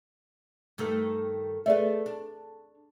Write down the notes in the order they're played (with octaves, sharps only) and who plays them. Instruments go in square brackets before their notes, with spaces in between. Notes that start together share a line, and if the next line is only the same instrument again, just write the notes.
[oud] G2 D#3 A3
[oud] A3 B3 [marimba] G#4 D5 E5
[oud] D4